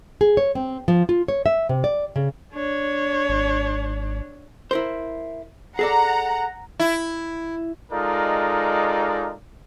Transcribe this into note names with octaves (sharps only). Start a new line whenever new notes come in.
G#4
C#5
C4
F3
F4
C#5
E5
C3
D5
C#3
D4 C#5
G#1
E4 A#4 C5
G#4 A4 D5 F#5 A#5
E4
G#3 D#4 F4 A4 A#4 D5